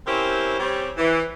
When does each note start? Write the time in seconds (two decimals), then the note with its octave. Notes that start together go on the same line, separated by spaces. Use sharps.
0.07 C4 C#4 E4 G4 A#4 C5
0.60 G3 C4 G4 C#5
0.98 E3